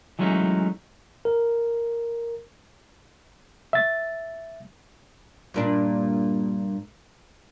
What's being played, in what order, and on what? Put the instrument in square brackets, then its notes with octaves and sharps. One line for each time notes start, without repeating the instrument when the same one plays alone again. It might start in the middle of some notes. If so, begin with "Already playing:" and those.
[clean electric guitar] E3 F#3 G#3 A3 C#4 D#4
[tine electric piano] A#4
[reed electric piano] E5 A6
[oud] G2 A#2 D4